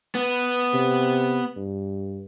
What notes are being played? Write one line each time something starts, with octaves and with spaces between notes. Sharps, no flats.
B3
C3
G2